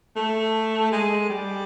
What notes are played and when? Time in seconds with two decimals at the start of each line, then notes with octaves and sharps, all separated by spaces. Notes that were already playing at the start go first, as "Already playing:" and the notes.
0.16 A3
0.91 G#3
1.29 G3